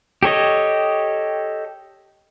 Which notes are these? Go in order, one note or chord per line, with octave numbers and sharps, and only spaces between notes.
G4 A4 C#5 D#5